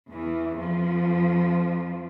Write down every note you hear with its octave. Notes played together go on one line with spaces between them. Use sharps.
E2 E3
F2 F3